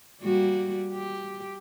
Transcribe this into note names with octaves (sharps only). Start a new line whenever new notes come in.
G3 A#3 F#4
G4